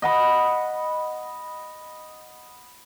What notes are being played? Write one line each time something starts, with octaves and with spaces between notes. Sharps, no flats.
D#5 F#5 B5